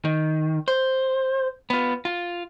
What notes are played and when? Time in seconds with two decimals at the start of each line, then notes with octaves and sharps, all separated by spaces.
0.05 D#3
0.68 C5
1.70 B3 F4
2.05 F4